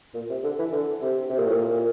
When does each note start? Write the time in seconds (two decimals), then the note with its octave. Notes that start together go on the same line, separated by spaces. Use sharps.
0.14 A#2
0.29 C3
0.43 D3
0.58 E3
0.72 D3
1.01 C3
1.29 C3
1.38 A#2
1.46 A2
1.54 A#2